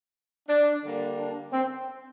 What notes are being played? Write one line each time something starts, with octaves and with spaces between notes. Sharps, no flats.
D4
D3 G3 A#3
D4
C4